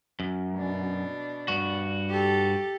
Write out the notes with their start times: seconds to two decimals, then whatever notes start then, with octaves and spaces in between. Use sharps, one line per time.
0.20 F#2
0.55 B2 D4
1.48 G2 F#4
2.09 G4 A4